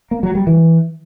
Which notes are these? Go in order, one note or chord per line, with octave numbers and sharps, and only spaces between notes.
A#3
F#3
G3
E3